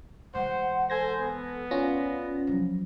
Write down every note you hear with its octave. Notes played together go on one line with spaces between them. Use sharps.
E3 G#3 C5 F#5
A4 C5 G#5 G#6 A#6
B3 A4
C#4 F4 D5 A#6
F3 F#3